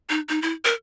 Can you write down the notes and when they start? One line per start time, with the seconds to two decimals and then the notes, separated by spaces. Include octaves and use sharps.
0.09 D#4
0.29 D#4
0.42 E4
0.65 A#4